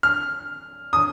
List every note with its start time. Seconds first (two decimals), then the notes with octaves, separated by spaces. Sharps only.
0.03 F6
0.93 D#6